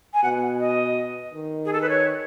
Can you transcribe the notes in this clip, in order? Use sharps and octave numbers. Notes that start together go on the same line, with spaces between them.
G#5
B2 F#5
D#5
D#3
G#4
A4
B4
C#5